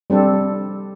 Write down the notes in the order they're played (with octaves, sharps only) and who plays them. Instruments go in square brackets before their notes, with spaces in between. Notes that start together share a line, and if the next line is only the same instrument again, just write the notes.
[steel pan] G3 C4 D4 A4